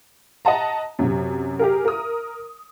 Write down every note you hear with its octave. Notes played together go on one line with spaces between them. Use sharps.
D#5 F#5 A5 A#5
F#2 C3
G4 G#4 A#4
A#4 D#6